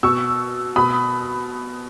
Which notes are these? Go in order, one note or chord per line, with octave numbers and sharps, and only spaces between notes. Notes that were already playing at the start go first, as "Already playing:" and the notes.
B2 C#6 E6
B2 B5 D#6